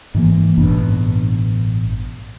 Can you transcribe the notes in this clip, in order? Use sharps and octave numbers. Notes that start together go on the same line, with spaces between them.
G#2 E3 A#3
A1 G2 B2 D4